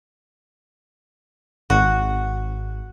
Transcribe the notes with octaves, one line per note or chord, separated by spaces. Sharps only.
G#1 F#4